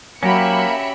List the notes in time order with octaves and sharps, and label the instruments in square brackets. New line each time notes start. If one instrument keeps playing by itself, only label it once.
[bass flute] F#3 [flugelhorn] A#3 [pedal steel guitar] C#4 F#4 G4 [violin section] E5 B5 C#7